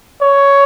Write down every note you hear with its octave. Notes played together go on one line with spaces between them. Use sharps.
C#5